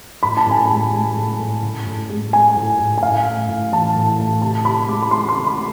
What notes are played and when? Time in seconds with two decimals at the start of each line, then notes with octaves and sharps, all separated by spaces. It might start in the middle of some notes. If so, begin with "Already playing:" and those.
0.23 A2 B5
0.37 A5
0.46 A2 G#5
0.66 G#3 A5
0.93 G#3
1.16 A2
1.39 A2
1.62 A2
1.86 A2
2.10 G#3
2.33 G#3 G#5
2.56 A2
2.80 A2
2.98 G#5
3.02 A2 F5
3.26 A3
3.48 A2
3.72 E3 A5
3.96 A2
4.19 A3
4.42 C3 A5
4.65 C3 B5
4.88 G#3 D6
5.02 B5
5.11 G#3 C6
5.29 C6
5.35 C3
5.47 B5